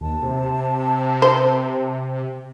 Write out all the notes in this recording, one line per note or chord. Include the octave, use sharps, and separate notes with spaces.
D#2 A5
C3
C5